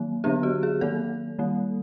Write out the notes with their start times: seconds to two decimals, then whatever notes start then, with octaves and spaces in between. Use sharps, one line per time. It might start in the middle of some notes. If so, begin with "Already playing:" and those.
Already playing: D#3 F#3 A#3
0.24 D3 F#3 B3 D4 G4
0.43 F#4
0.63 G#4
0.81 D#3 F#3 A#3 A4
1.39 D#3 G3 A#3